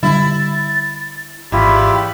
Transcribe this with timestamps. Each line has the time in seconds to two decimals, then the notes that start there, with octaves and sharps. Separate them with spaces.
0.03 D3 G3 E4 A6
1.52 G#1 E2 E4 F4 G4 B5